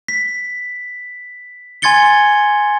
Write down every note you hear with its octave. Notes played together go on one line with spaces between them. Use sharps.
B6
G#5 C6 G#6 A6 C#7 G7